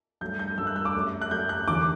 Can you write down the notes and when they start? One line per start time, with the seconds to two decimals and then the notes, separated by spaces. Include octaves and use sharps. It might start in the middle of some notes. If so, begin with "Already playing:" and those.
0.21 G2 F#3 A3 G6
0.39 G6
0.58 G2 F#3 A3 E6
0.67 F#6
0.76 E6
0.85 D6
0.95 F#2 F#3 A3
1.22 F#6
1.31 F#2 F#3 A3 G6
1.49 F#6
1.68 E2 D3 F#3 D6